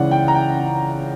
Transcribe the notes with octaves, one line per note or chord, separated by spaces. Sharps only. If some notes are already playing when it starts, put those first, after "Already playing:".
Already playing: C#2 C#3 E3 D5 F#5
G5
A#5
G5